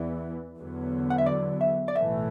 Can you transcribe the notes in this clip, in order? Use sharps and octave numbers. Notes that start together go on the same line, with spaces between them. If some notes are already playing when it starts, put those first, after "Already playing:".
Already playing: E2 E3 B3 D5
E2 D3 F#3 B3
F#5
E5
D5
E5
D5
B1 A2 E3 A3 E5